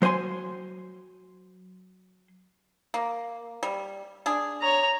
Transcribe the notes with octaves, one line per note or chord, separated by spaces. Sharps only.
F#3 C5 F#5 G#5 C6
A#3
G3
D4 G#4
C#5 A#5